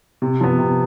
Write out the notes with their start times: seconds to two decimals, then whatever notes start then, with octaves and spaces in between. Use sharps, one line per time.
0.22 C3
0.40 F3 B3
0.58 C3